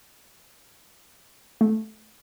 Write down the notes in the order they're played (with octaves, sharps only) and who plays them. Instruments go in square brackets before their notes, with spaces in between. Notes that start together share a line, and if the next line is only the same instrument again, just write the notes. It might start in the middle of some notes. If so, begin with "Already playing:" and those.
[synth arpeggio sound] A3